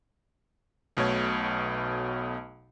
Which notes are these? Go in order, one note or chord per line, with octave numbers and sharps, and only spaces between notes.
B1 B2 A3 C#5